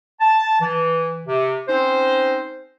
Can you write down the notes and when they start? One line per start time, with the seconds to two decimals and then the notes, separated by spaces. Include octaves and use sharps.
0.20 A5
0.61 E3
1.26 C3
1.68 C4 C#4 D#4 C5